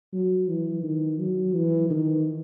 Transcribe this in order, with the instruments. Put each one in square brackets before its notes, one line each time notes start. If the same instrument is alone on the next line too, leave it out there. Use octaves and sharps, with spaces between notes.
[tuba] F#3
E3
D#3
F#3
E3
D#3